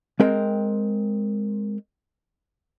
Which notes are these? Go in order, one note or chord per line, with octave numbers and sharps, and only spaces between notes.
G#3 C4 A#4 G5